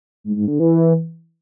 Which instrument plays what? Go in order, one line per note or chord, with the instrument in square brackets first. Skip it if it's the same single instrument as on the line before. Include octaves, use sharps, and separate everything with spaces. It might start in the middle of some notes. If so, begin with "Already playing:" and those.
[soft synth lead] G#2
G#2
D3
E3